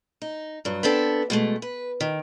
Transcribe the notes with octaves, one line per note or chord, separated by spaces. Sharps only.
D#4
G2 F#3
B3 C4 D4 A4
B2 G#3 A3
B4
D#3